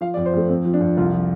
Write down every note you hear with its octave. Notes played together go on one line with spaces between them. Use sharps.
F3 F5
D5
F2
C5
F2 A3
F2 C4
F3
D4
F2
C2 F4
F3